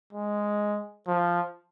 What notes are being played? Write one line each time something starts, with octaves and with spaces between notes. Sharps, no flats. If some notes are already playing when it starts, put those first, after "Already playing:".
G#3
F3